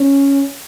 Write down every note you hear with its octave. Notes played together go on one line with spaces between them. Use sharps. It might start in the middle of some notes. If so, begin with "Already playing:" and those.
Already playing: C#4